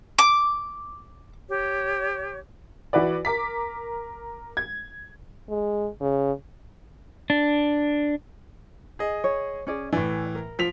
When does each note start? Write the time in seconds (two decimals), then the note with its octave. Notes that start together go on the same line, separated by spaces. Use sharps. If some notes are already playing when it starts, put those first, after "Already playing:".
0.19 D6
1.50 G4 C#5
2.93 E3 F#4 B4 D5
3.25 A#4 D6 B6
4.57 G#6
5.49 G#3
6.01 C#3
7.30 D4
8.99 G#4 D#5
9.24 C#5
9.67 C#4 G#4 D5
9.92 A2 E3 D5 G#5
10.35 A#4
10.59 F3 B6 F7